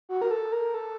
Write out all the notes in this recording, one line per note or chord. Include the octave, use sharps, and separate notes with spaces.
F#4
A#4
A4
A#4
A4